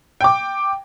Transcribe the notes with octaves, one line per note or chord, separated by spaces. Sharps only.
G5 D6